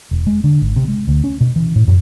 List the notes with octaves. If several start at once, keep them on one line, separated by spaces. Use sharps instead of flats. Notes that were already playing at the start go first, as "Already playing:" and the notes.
E1
G#3
D3
G#1
C3
G#3
D2
C#4
B2
E3
A2
F#2